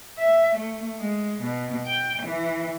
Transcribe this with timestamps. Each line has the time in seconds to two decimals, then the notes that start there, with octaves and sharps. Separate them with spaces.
0.18 E5
0.54 A3
0.97 G#3
1.41 B2
1.86 G5
2.22 E3